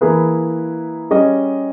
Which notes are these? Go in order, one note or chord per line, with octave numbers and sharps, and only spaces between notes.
E3 A#3 E4 G#4 B4
G3 C#4 G#4 D#5